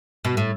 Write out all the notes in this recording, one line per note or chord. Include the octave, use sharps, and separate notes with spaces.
B2
A2